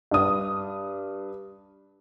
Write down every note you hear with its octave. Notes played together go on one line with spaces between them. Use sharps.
G2 D#6